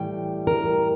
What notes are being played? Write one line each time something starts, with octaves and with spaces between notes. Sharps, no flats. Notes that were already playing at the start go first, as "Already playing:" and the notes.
Already playing: A2 E3 G3 G5
A#4